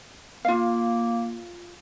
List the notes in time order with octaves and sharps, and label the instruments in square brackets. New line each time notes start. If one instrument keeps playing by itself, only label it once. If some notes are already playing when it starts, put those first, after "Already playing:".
[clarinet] A#3 [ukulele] F4 F5